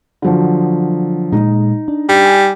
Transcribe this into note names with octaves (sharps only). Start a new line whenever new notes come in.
D3 F3 F#3
A#2 G#3 D#4
D4
G3
G#5